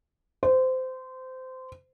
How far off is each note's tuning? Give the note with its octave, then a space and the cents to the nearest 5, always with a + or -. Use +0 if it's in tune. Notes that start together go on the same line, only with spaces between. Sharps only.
C5 -20